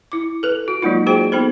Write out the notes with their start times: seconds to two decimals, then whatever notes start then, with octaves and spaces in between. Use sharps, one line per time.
0.12 E4 D6
0.43 A4 B4
0.68 F#4
0.82 F#3 G#3 A#3 D#4 F4
1.07 F#4 G#4 C5 G5
1.32 B3 D#4 A4 C5